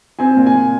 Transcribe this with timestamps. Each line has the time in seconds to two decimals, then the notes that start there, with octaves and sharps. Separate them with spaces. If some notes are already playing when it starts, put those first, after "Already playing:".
0.19 C4 G#5
0.37 A#2
0.46 G#5
0.55 A#2